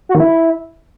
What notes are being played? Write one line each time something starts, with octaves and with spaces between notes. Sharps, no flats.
F#4
D#3
E4